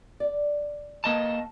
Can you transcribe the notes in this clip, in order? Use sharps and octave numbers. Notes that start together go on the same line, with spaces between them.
D5
A#3 D#5 A5